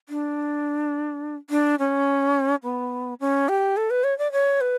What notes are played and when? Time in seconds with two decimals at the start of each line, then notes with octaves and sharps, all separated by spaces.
0.09 D4
1.50 D4
1.79 C#4
2.63 B3
3.20 C#4
3.49 G4
3.77 A4
3.90 B4
4.04 C#5
4.18 D5
4.32 C#5
4.61 B4